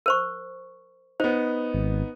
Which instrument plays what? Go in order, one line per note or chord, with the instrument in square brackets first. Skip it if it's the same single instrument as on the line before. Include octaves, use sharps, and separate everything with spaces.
[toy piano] A#4 C5 C#6
[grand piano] B3 D#4 [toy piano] C5
[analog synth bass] G#1